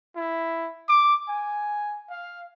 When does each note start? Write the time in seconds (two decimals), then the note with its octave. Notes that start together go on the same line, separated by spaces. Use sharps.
0.16 E4
0.89 D6
1.28 G#5
2.10 F5